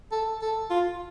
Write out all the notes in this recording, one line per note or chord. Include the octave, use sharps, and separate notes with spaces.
A4
A4
F4